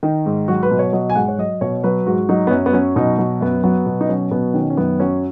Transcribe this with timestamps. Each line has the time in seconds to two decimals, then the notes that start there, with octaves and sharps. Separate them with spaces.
0.03 D#3 D#4
0.26 G#2
0.48 F#3 F#4
0.63 B4
0.71 B2
0.79 C#5
0.93 F#3 D#5
1.10 G#5
1.15 G#2 F#5
1.28 C#5
1.38 F#3 D#5
1.61 B2 C#5
1.84 F#3 B4
2.06 G#2 F#4
2.29 F#3 D#4
2.47 B3
2.51 F#2 C#4
2.66 B3
2.73 F#3 C#4
2.96 B2 D#4
3.18 F#3
3.41 F#2 B3
3.64 F#3 B3
3.86 B2
4.01 D#4
4.09 F#3 C#4
4.31 B2 B3
4.54 D#3 C#4
4.70 C#4
4.77 F#2 B3
5.00 F#3 C#4